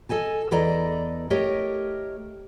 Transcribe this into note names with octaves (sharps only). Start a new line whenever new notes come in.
A4 D#5 G#5 A5
E2 E4 A4 D5 D#5 A#5
A3 G4 A#4 C#5 D#5